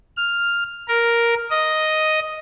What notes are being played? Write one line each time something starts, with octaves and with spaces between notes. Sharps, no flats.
F6
A#4
D#5